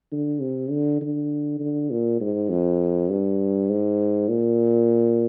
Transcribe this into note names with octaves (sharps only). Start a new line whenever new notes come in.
D3
C3
D3
D3
D3
A#2
G#2
F2
G2
G#2
A#2